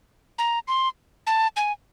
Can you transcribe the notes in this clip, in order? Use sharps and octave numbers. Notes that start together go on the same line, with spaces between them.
A#5
C6
A5
G#5